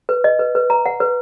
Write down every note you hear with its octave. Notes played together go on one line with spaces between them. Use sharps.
B4
D#5
B4
B4
A#5
F#5
B4